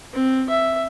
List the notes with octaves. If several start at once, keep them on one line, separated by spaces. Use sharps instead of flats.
C4
E5